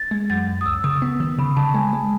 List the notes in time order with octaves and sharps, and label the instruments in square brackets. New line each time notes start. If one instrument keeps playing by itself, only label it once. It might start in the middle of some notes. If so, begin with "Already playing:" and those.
Already playing: [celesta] A6
[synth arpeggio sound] G#3
[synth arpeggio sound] F#2 [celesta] A6
[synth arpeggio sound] F#2
[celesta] D#6
[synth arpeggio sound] C#2 [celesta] E6
[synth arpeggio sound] C#3 [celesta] D#6
[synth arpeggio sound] B3
D#3
[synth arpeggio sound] C#3 [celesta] B5
[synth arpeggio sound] C#3 [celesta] A5
[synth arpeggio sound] G#3 [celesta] G#5
[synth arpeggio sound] G#3